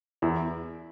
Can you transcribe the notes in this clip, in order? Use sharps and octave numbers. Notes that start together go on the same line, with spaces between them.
E2 E4